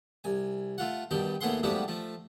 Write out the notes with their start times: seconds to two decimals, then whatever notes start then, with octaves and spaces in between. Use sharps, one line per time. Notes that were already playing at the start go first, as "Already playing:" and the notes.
0.24 C2 G#5
0.78 A3 F4 F#5
1.11 G2 B2 D#3 G5 A5
1.41 D#2 B2 A3 G#4 F#5 C6
1.63 G#2 F3 G3 A3 B3 F#4
1.88 F3 A3